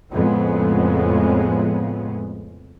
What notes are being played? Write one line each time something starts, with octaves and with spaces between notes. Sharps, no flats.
F2 A2 C#3 G#3 B3